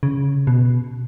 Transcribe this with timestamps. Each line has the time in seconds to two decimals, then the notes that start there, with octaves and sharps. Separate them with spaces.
0.03 C#3
0.47 B2